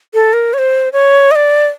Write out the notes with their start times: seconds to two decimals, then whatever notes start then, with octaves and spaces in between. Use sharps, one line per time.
0.14 A4
0.33 A#4
0.53 C#5
0.58 C5
0.93 C#5
1.31 D#5
1.35 D5